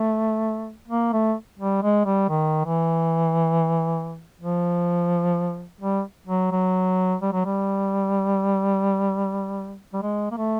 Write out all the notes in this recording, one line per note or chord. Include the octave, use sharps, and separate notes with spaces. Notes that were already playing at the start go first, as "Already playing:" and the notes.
Already playing: A3
A#3
A3
G3
G#3
G3
D#3
E3
F3
G3
F#3
F#3
G3
F#3
G3
G3
G#3
A#3
A3